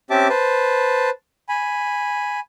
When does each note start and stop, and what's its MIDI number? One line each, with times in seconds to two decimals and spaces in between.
0.10 0.28 60
0.10 0.28 61
0.10 0.28 67
0.10 0.28 76
0.10 0.28 81
0.10 0.28 86
0.29 1.10 71
0.29 1.10 72
0.29 1.10 81
1.49 2.40 80
1.49 2.40 83